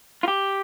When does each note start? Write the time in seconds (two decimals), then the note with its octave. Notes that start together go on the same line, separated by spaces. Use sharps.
0.23 F4
0.28 G4